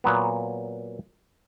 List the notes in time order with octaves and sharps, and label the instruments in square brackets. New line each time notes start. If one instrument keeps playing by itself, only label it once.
[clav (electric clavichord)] A#2 F#3 B3